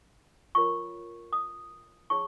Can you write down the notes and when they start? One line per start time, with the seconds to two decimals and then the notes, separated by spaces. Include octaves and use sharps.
0.55 F4 A#4 C#5 C#6
1.33 D#6
2.10 D#4 G#4 C#5 C#6